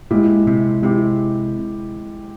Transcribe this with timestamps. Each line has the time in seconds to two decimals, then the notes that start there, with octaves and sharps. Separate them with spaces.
0.10 A#2 G#3 E4 G4
0.47 C3
0.82 C3 G#3 E4 G4